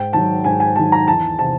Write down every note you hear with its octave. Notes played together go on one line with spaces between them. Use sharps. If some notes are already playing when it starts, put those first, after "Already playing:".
Already playing: G#2 G5
D#3 F#3 A5
G#2 G#5
G#5
D#3 F#3 A5
A#5
E2 A5
C3 E3 A5